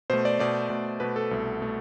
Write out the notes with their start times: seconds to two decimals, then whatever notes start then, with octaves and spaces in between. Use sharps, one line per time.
0.10 B2 A3 C5
0.25 D5
0.39 B2 A3 D5
0.70 B2 A3
1.00 B2 A3 B4
1.16 A4
1.31 C2 B2 A3
1.61 B2 A3